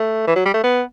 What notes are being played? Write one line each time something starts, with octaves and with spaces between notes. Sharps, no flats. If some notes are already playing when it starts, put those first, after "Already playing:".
Already playing: A3
E3
F#3
G3
A3
B3